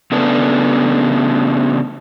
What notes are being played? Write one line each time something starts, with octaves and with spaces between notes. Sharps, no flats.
C#3 A3 B3 D4